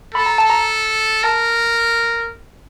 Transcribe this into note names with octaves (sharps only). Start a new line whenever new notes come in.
A4 B5
A#5
A5
A#5
A#4 A5